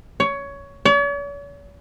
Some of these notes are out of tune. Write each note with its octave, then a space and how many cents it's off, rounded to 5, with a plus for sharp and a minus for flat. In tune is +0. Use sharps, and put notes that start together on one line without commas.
C#5 +15
C#5 +45